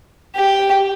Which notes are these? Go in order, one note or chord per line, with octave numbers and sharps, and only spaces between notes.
G4